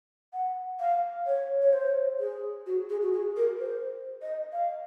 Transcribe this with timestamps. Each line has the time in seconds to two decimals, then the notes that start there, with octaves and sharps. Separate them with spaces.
0.33 F#5
0.80 F5
1.27 C#5
1.62 C#5
1.73 C5
2.20 G#4
2.66 F#4
2.90 G#4
3.02 F#4
3.13 G#4
3.36 A#4
3.60 C5
4.22 D#5
4.53 F5